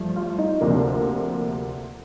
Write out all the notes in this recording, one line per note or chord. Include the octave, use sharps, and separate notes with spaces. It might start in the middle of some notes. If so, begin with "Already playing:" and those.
Already playing: G2 F3 A3
F4
D#4
D2 C3 F3 A#3 D4